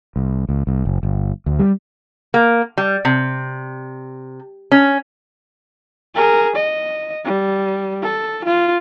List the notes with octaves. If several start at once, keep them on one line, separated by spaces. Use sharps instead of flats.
C2
C#2
C2
F#1
G1
D2
G3
A#3
G3
C3
C#4
G#4 A#4
D#5
G3
A4
F4